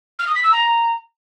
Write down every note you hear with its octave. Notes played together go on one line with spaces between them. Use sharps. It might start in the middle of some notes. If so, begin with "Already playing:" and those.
F6
D#6
B6
E6
A#5